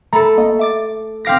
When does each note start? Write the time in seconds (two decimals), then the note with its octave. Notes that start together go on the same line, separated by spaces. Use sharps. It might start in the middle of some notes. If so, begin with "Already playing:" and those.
0.13 A3 A4 A#5 B5
0.38 G1 A#3 D#5
0.59 E5 D6 A6
1.25 C4 F5 G5 D6 A#6 B6